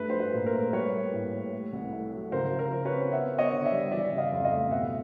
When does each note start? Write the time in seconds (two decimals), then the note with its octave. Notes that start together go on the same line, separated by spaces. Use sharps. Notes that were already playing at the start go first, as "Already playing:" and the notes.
Already playing: G2 A3 B4
0.10 F3 C5
0.20 B4
0.33 A#2
0.46 A#4
0.53 A3
0.73 G3 B4 C#5
0.93 A#3
1.13 A2
1.33 A2
1.53 A3
1.73 C2
1.93 A3
2.12 F#3
2.32 C#3 A#4 C5
2.52 F3
2.59 A#4 C5
2.72 F3
2.85 B4 C#5
2.92 C4
3.12 B3 E5 F#5
3.32 B3
3.38 C#5 D#5
3.52 D3
3.65 D5 E5
3.72 G3
3.91 E3 D5 E5
4.11 C#3
4.18 D#5 F5
4.32 F2
4.45 D#5 F5
4.51 A3
4.71 B2 E5 F#5